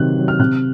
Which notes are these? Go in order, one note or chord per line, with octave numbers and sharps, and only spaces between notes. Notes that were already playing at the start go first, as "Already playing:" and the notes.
Already playing: C3 D#3 F#3 F#6
D#3 F#3
F6
C3 F#6